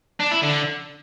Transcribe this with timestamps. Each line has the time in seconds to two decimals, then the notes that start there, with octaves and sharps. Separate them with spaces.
0.20 D4
0.32 E4
0.43 D3